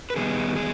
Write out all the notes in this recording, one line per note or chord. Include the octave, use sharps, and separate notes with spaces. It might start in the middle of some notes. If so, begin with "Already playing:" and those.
B4
D#3 G3 B3 D#4 G#4
G#4